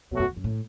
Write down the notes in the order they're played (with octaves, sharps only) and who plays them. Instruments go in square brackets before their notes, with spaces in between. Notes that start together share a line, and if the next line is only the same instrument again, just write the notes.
[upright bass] E2 [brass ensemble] B2 F#3 A3 F#4
[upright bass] F#2
E2
F#2
A2